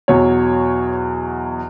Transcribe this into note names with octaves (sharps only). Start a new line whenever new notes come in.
E2 B2 F#3 C#5